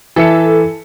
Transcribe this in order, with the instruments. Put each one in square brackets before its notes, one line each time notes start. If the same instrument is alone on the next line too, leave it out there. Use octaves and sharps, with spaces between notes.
[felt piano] E3 E5 C#7 [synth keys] A4